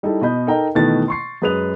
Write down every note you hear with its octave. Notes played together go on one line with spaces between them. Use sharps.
G3 D#4 E4 G#4 A4
B2 D#5 B5 G6
D#4 A4 A#4 D#5 G5 A#5
B2 D#3 E3 A3 B4 A6
C6 C#6 C7
F#2 G#3 B4 D#6 F7